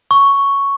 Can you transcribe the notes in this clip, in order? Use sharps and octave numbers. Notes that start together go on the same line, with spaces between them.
C#6